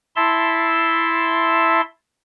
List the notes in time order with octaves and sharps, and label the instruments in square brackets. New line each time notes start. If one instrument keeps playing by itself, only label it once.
[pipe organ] E4 E5 A5 C6